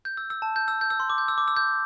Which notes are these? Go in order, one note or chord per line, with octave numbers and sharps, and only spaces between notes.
G6
E6
E6
A5
G6
E6
G6
E6
C6
D6
G6
E6
D6
E6
G6